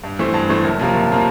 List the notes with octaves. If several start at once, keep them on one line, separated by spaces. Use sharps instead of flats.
G2
E3 A3 C4
G2
E3 A3 C4
F#1
F2 C3 F3 A#3
F#1
C3 F3 A#3